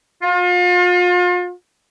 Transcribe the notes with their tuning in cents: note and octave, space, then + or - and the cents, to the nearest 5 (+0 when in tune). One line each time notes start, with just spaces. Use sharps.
F4 +35